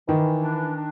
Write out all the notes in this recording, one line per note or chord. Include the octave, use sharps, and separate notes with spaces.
D#3 E3
D4
D4